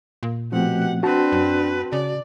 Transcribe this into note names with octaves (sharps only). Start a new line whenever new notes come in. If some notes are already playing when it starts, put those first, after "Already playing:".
A#2
B2 F3 A3 C4 G4 F#5
C4 D4 F#4 B4 A5
F#2
C#3 D5